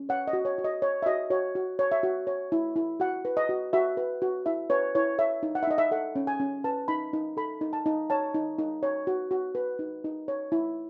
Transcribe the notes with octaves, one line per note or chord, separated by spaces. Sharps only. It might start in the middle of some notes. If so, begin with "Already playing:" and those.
Already playing: C#4
C#5 F#5
D#5
F#4
C#5
F#4
D#5
C#5
E5
F#4 D#5
F#4 C#5
F#4
C#5
E5
F#4
C#5
E4
E4
F#4 F#5
B4
D#5
F#4
F#4 E5
B4
F#4
E4 E5
B4 C#5
E4 C#5
C#5 E5
D#4
F#5
E5
D#4 D#5
E5
A4 F#5
C#4
G#5
C#4
B4 A5
D#4 B5
D#4
A4 B5
D#4
A5
D#4
C#5 A5
D#4
D#4
C#5
F#4
F#4
B4
D#4
D#4
C#5
E4